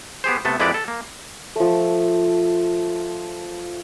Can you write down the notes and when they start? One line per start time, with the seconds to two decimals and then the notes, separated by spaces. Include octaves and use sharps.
0.24 B3 G4 G#4 C5
0.45 C3 A3 B3 A4
0.60 F2 G#3 E4 G4 B4 D5
0.74 A4
0.88 A#3
1.56 F3 A3